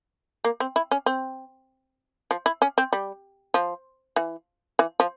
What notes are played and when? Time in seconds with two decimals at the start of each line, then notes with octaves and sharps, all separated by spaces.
0.44 A#3
0.60 C4
0.76 E4
0.91 C#4
1.06 C4
2.31 F3
2.46 E4
2.62 C#4
2.78 C4
2.93 G3
3.54 F3
4.16 E3
4.79 E3
5.00 F3